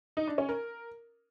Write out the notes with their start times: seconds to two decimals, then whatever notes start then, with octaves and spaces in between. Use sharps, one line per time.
0.17 D#4
0.27 D4
0.38 C#4
0.49 A#4